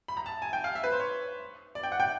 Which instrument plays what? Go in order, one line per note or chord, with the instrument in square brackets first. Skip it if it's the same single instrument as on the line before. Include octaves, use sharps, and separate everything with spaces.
[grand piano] B5
A#5
A5
G#5
G5
F5
E5
B4
C5
C#5
D5
G5
F#5
G5